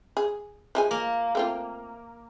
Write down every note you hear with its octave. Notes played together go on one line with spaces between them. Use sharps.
G#4
F3 G#3 G#5
A#3
A3 C4 F4